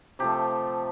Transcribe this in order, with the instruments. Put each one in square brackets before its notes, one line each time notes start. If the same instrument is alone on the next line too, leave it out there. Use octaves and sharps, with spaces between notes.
[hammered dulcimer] C3 F3 A3 G4